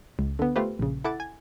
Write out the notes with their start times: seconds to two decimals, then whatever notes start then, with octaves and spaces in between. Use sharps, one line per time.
0.19 C#2
0.39 D3 B3
0.56 A3 F4 G4 B4 C5
0.79 A#1 C#3
1.04 E4 A4 F#5 D6 A6
1.20 G#5